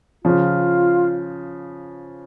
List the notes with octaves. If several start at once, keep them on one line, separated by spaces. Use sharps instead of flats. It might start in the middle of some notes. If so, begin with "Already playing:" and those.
C#3 F3 F4